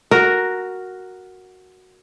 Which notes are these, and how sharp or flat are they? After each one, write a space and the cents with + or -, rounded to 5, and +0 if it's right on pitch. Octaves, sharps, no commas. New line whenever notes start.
F#4 +0 A#4 +0